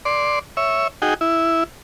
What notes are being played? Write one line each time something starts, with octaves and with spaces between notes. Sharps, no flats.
D5 C6
C#5 E5
D#4 F#4 G#4 G5
E4